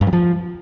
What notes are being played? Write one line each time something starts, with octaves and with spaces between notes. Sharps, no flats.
G2
F#3
F3